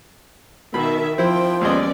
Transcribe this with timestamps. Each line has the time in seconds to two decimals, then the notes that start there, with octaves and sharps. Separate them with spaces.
0.74 B2 D#3 E5 B5
1.18 F3 C4 E4 G5
1.61 D#2 G#3 B3 C#4 D5 D#5